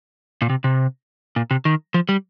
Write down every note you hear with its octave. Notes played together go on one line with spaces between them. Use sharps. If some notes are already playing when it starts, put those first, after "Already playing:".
A#2
C3
C3
A#2
C3
D#3
F3
G3